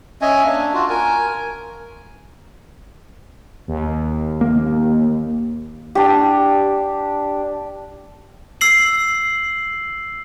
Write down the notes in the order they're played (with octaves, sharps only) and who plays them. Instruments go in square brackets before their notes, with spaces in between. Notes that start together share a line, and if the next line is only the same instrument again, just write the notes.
[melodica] C#4 D#5 E5 G#5
A#3 D4
F4 F#4
A#4 G#5
[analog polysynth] D#2
[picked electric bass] A#3
[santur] D4 G4
[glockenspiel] E6 C7 F#7